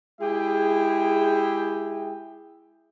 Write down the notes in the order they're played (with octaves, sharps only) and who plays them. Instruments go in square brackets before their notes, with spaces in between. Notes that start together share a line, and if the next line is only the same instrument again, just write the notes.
[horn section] G#3 E4 G4 G#4 E5 G5